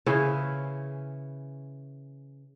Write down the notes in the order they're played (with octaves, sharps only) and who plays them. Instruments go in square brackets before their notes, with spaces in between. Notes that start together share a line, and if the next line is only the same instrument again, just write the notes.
[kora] C#3 E3 C#4 E4